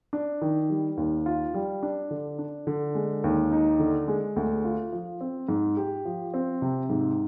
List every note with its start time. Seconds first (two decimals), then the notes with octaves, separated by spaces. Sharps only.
0.13 D4
0.41 D#3
0.70 G3
0.97 D#2
1.26 F4
1.54 G3
1.83 D4
2.11 D3
2.39 D4
2.67 D3
2.95 G#3
3.24 D#2
3.52 D#4
3.79 D3
4.08 G#3
4.36 D2
4.64 F4
4.92 F3
5.21 C4
5.48 G#2
5.77 G4
6.05 F3
6.34 C4
6.62 C3
6.90 G#2